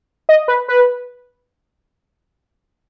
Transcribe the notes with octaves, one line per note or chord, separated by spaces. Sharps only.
D#5
B4
B4